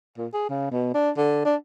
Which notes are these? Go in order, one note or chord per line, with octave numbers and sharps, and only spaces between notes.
A#2
G#4
C#3
B2
D4
D3
D4